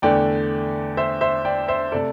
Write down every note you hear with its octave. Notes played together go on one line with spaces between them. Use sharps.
E2 D3 A3 D5 G5
C5 E5
C5 E5
D5 G5
C5 E5
C3 A3 A4 D5